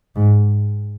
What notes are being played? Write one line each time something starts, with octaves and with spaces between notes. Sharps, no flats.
G#2